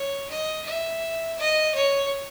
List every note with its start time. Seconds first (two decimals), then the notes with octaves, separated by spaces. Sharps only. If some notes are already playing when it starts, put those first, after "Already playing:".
Already playing: C#5
0.30 D#5
0.66 E5
1.38 D#5
1.75 C#5